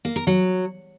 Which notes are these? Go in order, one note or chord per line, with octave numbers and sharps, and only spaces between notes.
A#3
A#4
F#3